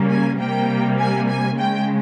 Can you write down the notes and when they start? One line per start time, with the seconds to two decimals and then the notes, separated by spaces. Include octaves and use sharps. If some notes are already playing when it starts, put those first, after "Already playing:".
Already playing: C#3 G3 A#3
0.09 G#5
0.39 C3 G3 A#3 G5
0.99 G#5
1.29 G#5
1.57 C#3 G#3 G5